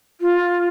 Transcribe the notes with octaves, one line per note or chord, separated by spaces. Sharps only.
F4